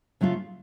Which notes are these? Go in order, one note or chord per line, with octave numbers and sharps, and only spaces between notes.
C#3 F#3 A3 F4